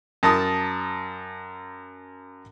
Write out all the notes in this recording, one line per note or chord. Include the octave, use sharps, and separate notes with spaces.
F#2 A5 D#6